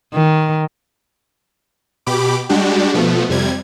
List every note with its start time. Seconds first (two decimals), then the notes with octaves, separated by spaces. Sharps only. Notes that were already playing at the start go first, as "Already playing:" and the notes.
0.14 D#3
2.06 B2 G4 B5 D6
2.49 G3 G#3 D4 F#4 G4
2.94 B2 F3 A3 B3
3.29 F2 C3 G3 G#6